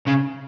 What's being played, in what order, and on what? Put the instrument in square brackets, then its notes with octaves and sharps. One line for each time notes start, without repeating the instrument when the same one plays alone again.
[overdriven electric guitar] C#3